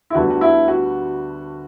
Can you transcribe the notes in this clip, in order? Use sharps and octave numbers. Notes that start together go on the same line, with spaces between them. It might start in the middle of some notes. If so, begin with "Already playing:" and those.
E4
D2 D3 G3 B3 F#4
F#4
E4
F#4